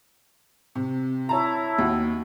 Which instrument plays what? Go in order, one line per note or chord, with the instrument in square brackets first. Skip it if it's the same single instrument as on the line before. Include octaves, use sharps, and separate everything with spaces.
[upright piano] C3
[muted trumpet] E4 [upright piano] C#5 A5 A#5
[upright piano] D#2 F#4